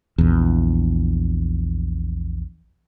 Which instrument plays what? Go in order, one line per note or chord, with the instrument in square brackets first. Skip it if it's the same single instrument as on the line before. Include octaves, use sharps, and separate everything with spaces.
[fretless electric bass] A#1 E2